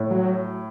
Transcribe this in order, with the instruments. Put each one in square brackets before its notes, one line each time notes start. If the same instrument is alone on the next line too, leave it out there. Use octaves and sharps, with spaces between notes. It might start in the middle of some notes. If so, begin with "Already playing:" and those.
Already playing: [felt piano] A2
[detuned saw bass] F#3